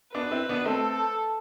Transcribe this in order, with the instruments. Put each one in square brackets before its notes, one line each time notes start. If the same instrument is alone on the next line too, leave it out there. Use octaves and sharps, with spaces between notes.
[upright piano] B3 D4 [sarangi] B4
[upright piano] C4 E4
B3 D4
[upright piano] A3 C4 [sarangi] A4